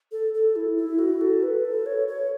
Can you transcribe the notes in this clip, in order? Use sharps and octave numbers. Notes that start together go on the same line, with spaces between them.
A4
A4
E4
E4
F#4
A4
B4
A4
C#5
C#5